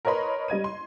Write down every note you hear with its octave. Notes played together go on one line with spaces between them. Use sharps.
A#4 B4 C#5 D#5 B5 C6
G3 D#5 G#6 D#7
C6